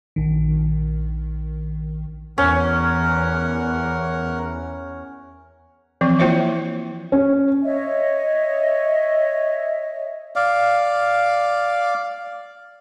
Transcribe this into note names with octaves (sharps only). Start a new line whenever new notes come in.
A#1 D#3
E2 C#4 A#4 F#5
E3 F3 C4
A#3 E4 F4 C5 C#5 E5
C#4
C#5 D#5 E5
D5 F5